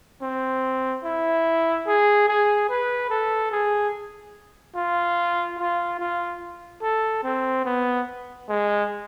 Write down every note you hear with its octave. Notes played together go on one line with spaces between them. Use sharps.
C4
E4
G#4
G#4
B4
A4
G#4
F4
F4
F4
A4
C4
B3
G#3